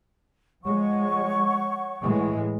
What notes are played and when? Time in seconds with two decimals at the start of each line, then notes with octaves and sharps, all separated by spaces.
0.64 F3 G#3 C#5 F#5 C#6
2.02 A2 E3 G#3